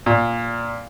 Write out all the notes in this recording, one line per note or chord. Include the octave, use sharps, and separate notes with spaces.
A#2